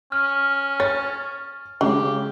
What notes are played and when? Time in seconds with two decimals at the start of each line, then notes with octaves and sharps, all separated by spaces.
0.12 C#4 F6
0.80 C#5 A6
1.81 C#3 F#3 G#3 G4